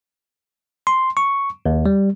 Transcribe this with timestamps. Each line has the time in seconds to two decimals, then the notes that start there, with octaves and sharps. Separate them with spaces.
0.87 C6
1.17 C#6
1.66 D#2
1.86 G3